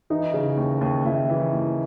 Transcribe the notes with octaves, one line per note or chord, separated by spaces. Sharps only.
E3 D#4
C#3
D#2
D#2
D#2 E4
E3
D#2